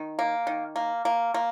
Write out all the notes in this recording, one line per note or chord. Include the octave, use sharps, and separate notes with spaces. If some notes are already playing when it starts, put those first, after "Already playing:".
Already playing: D#3
A#3
D#3
A#3
A#3
A#3